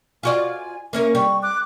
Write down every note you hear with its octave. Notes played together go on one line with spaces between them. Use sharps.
F4 F#4 D5 G#5
A#3 C#4 A#4 E5
G3 C#6
D6 F#6